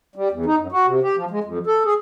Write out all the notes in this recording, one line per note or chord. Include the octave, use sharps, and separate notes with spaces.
G3
E2
D#4
F#2
F#4
C3
G4
F3
G#3
F2
A4
G#4